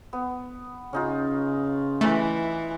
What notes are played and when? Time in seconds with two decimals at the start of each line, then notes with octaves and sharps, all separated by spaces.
0.13 B3
0.93 C#3 C#4 D#4 F4
2.01 E3 A3